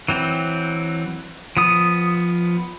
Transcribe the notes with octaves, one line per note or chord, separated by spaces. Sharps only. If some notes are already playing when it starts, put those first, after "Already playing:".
E3 F#3 C4
F3 B3 D#6